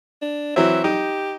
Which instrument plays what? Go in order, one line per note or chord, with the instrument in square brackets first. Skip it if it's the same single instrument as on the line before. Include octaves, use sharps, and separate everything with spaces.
[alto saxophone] D4
[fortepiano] E3 F#3 C4 [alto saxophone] E5
[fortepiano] D#4 [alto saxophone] G4